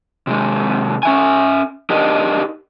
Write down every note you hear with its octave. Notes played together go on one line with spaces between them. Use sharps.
C3 D#3 G#3
C#4 E5 G#5
D4 D#4 G4 A#4 D#5